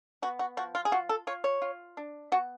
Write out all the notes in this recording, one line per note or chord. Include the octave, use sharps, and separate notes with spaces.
B3 F#4
F#4
F3 F#4
F4
G#4
F4 F#4
A4
F4 C#5
C#5
F4
D4
B3 F#4